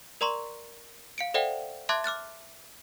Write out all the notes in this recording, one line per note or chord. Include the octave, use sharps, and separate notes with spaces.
A#4 D5 A#5 C6 C#6
F5 C#7 D7
A4 C5 D5 E5 F#5 G5
E5 A5 C6 D6 F#6 G#6
D6 F6 F#6 A6